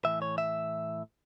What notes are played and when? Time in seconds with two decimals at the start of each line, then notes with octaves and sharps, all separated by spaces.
0.05 A2 E3 E5
0.22 C#5
0.38 E5